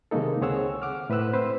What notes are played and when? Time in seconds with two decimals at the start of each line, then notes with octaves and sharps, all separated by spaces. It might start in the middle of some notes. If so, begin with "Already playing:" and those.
0.11 C3 D#3 G#3 A#3 D#4 A4
0.41 C#2 C4 G#4 C#5 F#5 E6
0.82 F#5 D6 F6
1.10 A2 B4 C5 E6 F#6
1.33 C4 B4 C5